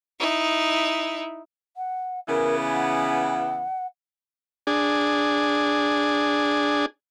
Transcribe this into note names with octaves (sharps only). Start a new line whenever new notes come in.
D#4 E4
F#5
C#3 E3 B3 A#4
F#5
D4 G#4